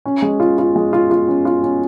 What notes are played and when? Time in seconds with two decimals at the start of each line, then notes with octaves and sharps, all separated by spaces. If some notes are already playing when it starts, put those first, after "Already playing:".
0.05 C#4
0.22 G#3
0.40 F4
0.58 F4
0.76 G#3
0.93 F4
1.11 F4
1.28 C#4
1.45 F4
1.63 C#4